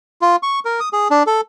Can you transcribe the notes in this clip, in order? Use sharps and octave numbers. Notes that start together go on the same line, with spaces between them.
F4
C#6
A#4
D#6
G#4
D4
A4